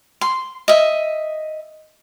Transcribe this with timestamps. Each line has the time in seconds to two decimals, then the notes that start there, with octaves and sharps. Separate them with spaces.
0.21 C6
0.68 D#5 E5